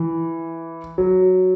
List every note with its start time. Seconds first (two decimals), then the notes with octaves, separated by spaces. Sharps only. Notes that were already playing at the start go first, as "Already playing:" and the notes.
Already playing: E3
0.98 F#3